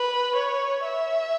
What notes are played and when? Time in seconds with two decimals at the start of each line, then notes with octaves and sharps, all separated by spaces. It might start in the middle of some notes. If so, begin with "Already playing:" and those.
Already playing: B4
0.35 C#5
0.85 E5